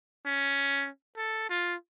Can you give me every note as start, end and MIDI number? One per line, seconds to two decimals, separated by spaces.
0.26 0.88 61
1.17 1.45 69
1.50 1.75 65